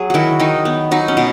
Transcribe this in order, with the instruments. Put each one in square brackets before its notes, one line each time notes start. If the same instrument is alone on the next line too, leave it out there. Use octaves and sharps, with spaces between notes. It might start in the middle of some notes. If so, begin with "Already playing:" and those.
Already playing: [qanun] F#3 G#4
D#3 E4 F#4
D#3 D#4
B3
F#3 D#4
C#4
B2